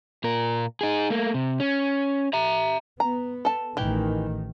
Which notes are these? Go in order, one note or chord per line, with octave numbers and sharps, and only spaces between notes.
A#2 A#4
D#4 G#4
A3 A#3
C3
C#4
E5 A#5
B3 A#5
A4 A5
A1 D#3 E3 G4